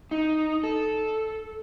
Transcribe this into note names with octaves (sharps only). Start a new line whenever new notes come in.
D#4
A4